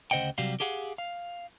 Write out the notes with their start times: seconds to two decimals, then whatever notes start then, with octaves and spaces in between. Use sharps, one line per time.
0.11 D2 C#3 C5 D#5 F#5 G5
0.38 C3 F#3 G3 F#4 G4 F5
0.60 G4 G#4 F5 F#5
0.98 F5